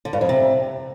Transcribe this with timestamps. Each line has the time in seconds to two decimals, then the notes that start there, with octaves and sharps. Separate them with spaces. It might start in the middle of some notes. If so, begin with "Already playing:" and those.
0.05 D3
0.13 G2
0.21 F2
0.29 C3